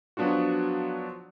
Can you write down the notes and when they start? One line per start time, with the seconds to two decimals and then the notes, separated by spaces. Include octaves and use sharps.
0.17 F3 F#3 B3 D4 F4 F#4